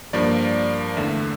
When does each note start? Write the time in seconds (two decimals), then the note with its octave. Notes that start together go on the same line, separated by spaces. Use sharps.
0.13 G2 F3 A#3 D5
0.97 E2 D3 A3 E5